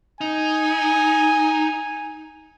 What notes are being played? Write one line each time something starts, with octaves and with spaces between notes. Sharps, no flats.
D#4 G#5